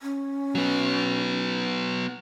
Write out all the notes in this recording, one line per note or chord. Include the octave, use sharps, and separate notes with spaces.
C#4
F#3 B3